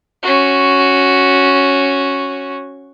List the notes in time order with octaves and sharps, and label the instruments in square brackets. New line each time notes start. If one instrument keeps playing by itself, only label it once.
[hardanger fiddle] C#4 F#4